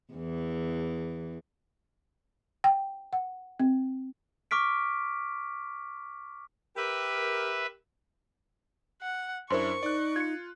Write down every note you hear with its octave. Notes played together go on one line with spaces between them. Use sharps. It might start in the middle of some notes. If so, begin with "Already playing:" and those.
E2 E3
G5
F#5
C4
C#6 D6 F6 B6 D7
G4 A#4 B4 E5
F#5
F#2 D4 E4 A#4 C5 C6 C#6
D#4 D5 F#6
F4 G#6 C#7